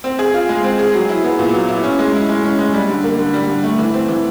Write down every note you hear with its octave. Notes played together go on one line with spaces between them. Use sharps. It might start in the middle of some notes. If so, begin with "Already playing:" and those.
C4
G#4
F4
G#3
C4
G#4
F#3
E4
B3
A#2
F#3
E4
C#4
G#3
E4
G#3
C#4
G#3
G3
D3
A#3
D3
G3
D3
A3
E3
C4
E3